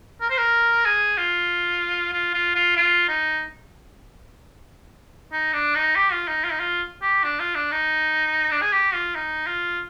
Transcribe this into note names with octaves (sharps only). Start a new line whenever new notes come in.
A#4
C5
A#4
G#4
F4
F4
F4
F4
F4
D#4
D#4
D4
D#4
G4
F4
D#4
F4
D#4
F4
G4
D4
F4
D4
D#4
D4
G#4
G4
F4
D#4
F4